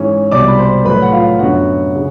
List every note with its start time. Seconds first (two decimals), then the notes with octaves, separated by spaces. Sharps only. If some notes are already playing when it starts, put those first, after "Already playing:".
Already playing: G#2 E3 G#3 C#4
0.31 C2 B2 G3 D5 D6
0.48 B5
0.59 C5 C6
0.85 A2 F#3 A3 B4 B5
1.02 F#5
1.12 F4 F5
1.39 F#2 D3 F#3 B3 F#4 F#5
1.95 C#3